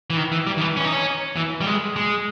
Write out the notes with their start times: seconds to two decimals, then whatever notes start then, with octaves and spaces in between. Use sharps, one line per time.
0.10 E3
0.17 D#3
0.32 E3
0.47 G3
0.58 D#3
0.61 E3
0.77 C#4
0.85 D#4
0.92 C#4
1.36 E3
1.61 G3
1.66 G#3
1.96 G#3